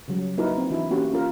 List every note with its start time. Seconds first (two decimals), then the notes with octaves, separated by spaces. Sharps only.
0.08 C#3 F#3 G3
0.38 A#3 D#4 E4 F#4 A#4 B4
0.57 C4
0.70 E3 D4 E4 F#4
0.91 A#3 C#4 F#4 G4
1.11 A#3 C#4 F4 A#4